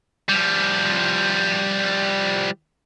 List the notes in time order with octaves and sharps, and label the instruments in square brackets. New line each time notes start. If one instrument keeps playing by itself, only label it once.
[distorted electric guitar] F3 G3